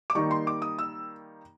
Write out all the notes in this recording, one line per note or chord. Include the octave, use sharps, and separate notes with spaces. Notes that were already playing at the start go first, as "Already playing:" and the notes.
D6
D#3 G3 A#3 D#4 C#6
C6
D6
D#6
E6